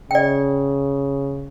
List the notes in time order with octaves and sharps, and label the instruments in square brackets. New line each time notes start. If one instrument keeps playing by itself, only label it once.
[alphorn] C#3 [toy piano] D5 G5